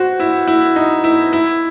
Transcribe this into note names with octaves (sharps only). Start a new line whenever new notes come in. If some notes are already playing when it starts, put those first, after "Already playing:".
Already playing: F#4 C5
E4
E4
D#4
E4
E4